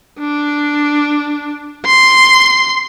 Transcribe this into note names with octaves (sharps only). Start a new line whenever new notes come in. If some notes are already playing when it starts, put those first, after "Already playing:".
D4
C6